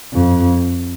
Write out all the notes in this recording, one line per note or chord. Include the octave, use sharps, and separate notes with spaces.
F2